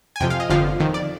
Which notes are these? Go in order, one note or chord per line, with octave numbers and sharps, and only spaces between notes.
G#5
F2 C3 F3 G5
F5
D#5
G1 F2 D3 F3 F5
F2 D#3
D5